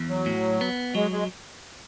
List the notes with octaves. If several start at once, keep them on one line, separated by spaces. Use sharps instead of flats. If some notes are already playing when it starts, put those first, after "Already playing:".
Already playing: E2
F#3
A2
B3
F#3 G#3
G#3